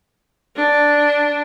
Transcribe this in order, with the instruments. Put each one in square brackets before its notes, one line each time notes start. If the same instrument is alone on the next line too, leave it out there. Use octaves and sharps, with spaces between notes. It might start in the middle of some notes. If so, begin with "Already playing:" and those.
[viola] D4